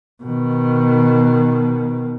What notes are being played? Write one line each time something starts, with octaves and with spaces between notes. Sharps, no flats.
B2 D#3